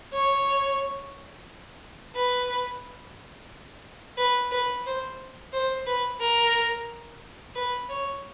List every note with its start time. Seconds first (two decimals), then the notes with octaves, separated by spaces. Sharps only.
0.13 C#5
2.15 B4
4.17 B4
4.51 B4
4.86 C5
5.53 C5
5.86 B4
6.20 A#4
7.55 B4
7.89 C#5